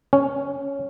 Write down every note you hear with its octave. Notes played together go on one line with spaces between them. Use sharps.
C#4